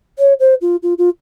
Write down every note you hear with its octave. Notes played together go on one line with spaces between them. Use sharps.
C#5
C5
F4
F4
F4